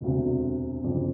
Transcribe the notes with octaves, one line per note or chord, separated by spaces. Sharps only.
E1 D2 C3
G1 F2 C#3